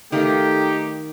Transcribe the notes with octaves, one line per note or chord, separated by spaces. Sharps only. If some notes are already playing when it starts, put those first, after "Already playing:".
D#3 A3 D#4 G4 D#5 F5